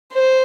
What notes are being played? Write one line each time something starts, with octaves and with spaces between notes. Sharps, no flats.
C5